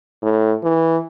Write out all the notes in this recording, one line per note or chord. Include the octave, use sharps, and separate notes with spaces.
A2
E3